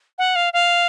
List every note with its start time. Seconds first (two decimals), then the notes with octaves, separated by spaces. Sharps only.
0.18 F#5
0.36 F5
0.53 F5